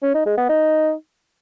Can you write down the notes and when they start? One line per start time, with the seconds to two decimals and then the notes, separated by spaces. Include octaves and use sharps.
0.02 C#4
0.14 D#4
0.26 G#3
0.37 B3
0.49 D#4